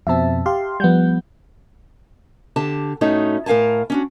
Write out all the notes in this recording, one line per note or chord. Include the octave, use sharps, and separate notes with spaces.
F2 B2 C4 E5 A5
G4 F5 C6
F3 G3 B3 F#5 G6
D3 G4 A5
A2 A3 C#4 D#4 F#4
A2 A#4 F5 G#5 A5
C#4 D4 F#4